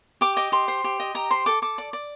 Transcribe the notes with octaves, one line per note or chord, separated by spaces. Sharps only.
G4 D6
D#5 D6
G4 C6
C5
G4
D#5
G4 A#5
C5 C6
A4 D6
A4 D6
D5
D5